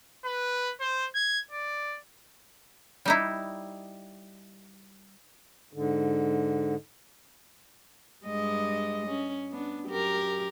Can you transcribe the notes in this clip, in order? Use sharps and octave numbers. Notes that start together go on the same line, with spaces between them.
B4
C5
G#6
D5
G3 D#4 E4
G#2 D3
G2 G#3 D#5
C#4
B3 D4
F#2 G4 A#4